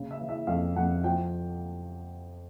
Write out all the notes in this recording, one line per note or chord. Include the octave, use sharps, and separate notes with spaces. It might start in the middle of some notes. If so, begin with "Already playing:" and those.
Already playing: C#3
E5
E3
E5
F2 F5
F2 F#5
F3 G5